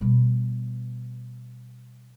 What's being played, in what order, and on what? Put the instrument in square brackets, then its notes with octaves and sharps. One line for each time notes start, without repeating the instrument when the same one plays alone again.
[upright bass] B2 G3